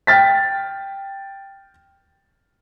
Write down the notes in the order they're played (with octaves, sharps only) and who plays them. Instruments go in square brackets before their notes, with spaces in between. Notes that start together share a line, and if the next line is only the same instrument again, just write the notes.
[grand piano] G5 F6 A6 B6